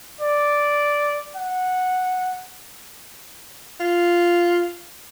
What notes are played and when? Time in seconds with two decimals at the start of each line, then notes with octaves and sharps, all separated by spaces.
0.21 D5
1.36 F#5
3.80 F4